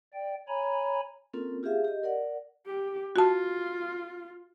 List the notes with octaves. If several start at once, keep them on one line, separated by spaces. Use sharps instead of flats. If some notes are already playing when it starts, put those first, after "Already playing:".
D5 G5
C#5 G#5 A#5 B5
A#3 C4 C#4 F4 A4 A#4
F4 G4 G#4 E5 F5
G4 D#5
A#4 D5 F#5
G4
F4 F#4 A5